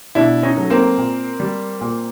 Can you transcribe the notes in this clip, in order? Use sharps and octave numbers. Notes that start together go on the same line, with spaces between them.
B2 D4 E4
C#4 D#4
F#3 A3
A#3 C4
A#2
G3
A#2